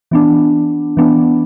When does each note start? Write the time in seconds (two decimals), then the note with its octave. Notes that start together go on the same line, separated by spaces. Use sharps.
0.11 E3 B3 D4
0.97 E3 B3 D4